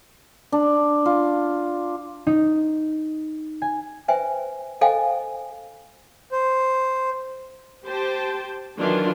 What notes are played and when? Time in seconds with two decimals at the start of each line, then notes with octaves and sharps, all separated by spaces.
0.52 D4
1.06 F4
2.27 D#4
3.62 G#5
4.08 B4 C5 E5 G5 G#5
4.81 A4 C5 D#5 F5 G5 G#5
6.32 C5
7.84 G4 C5 G5 A5
8.78 D#3 E3 F#3 D4 E4 F4